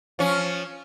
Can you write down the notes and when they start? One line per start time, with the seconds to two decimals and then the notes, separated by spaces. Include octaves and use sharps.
0.19 F3 C#4